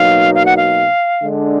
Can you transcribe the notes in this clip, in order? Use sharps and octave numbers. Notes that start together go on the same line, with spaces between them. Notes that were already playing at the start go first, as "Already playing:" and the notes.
Already playing: B2 F#3 A#3 D#4 F5
F5
F#5
F5
D3 G#3 D4